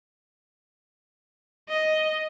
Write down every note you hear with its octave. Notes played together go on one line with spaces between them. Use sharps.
D#5